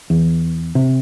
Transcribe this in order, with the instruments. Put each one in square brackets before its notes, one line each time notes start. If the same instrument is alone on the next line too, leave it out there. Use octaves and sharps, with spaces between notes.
[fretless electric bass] E2
C3